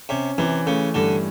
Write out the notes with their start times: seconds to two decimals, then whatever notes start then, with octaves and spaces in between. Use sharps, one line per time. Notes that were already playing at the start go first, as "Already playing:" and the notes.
0.09 C3 C#4
0.38 C3 E3
0.66 C#3 A3
0.94 G2 D3